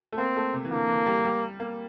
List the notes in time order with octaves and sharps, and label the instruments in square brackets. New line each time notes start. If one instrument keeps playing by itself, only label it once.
[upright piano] A3
[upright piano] A#3 [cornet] C4
[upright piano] A3
C3
E3
[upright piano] D3 [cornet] A#3
[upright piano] E3
G3
G3
A#3